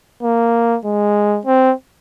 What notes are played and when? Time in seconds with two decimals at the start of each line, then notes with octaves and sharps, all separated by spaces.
0.23 A#3
0.85 G#3
1.45 C4